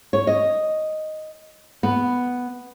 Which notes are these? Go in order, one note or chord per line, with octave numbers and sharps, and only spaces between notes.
C#5
D#5
B3